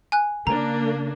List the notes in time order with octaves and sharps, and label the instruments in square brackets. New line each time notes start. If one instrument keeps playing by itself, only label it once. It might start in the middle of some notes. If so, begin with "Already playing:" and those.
[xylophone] G#5 F#6
[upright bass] C#3 [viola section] A#3 D4 [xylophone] A#5